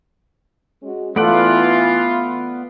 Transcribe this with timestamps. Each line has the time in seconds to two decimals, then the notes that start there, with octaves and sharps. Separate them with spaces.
0.83 G#3 C#4 F#4
1.16 E3 A3 B3 F4 A4 D5 F#5